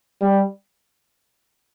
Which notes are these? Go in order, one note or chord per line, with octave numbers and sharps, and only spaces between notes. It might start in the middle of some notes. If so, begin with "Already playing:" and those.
G3